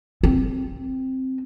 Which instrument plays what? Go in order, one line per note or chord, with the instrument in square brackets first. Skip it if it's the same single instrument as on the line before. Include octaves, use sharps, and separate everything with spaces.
[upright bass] C4